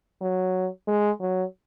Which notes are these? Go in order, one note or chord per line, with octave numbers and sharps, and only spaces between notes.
F#3
G#3
F#3